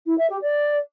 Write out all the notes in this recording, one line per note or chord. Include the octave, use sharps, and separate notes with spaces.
E4
E5
G4
D5